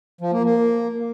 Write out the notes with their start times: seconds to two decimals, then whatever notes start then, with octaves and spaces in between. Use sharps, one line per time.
0.21 F3
0.32 A#3
0.44 A#3